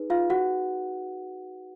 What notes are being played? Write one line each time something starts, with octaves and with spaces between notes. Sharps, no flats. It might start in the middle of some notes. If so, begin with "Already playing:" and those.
Already playing: D#4 G#4 B4
F4 F5
F#4 F#5